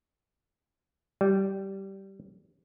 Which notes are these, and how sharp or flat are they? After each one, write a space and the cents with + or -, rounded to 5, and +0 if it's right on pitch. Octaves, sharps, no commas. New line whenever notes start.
G3 -15